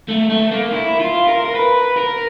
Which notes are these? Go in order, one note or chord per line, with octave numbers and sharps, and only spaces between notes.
A3
A3
A#3
E4
F4
A#4
A#4
B4
A#4